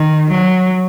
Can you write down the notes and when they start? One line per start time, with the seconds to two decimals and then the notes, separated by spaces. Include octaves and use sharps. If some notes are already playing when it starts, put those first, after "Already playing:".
Already playing: D#3
0.31 F#3